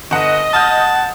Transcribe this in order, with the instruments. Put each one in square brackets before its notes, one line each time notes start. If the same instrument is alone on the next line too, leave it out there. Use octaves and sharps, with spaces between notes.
[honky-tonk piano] G1 F#5 [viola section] D#5
[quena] F#5 [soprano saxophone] A5 [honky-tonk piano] D#6 F6 G6